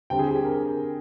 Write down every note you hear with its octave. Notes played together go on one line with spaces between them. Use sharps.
D3 G3 C4 G5
G#4
G4
G#4
A#4